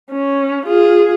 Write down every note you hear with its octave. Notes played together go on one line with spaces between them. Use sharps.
C#4
F4 G#4